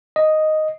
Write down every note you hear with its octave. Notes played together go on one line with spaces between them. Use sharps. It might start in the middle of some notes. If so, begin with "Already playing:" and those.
D#5